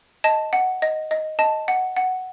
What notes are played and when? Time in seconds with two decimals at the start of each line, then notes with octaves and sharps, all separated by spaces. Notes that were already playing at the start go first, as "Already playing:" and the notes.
0.24 D#5 A5
0.53 F#5
0.82 D#5
1.11 D#5
1.39 D#5 A5
1.68 F#5
1.96 F#5